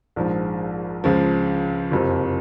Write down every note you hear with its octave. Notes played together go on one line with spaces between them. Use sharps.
A#1 G#2 F3
C#2 C#3 F3
F#1 F2 C3 F3